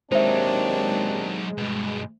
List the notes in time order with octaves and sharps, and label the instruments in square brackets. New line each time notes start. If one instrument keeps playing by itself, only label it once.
[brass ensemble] D#2 C4 D4 [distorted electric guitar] F#3 D#4 [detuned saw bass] G#3 [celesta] C5 E5
[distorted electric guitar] G2 B2